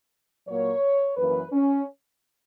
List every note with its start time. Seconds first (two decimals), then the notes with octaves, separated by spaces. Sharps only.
0.48 A#2 F#3 A#3 C#5
1.17 F#2 E3 A#3 B4
1.51 C#4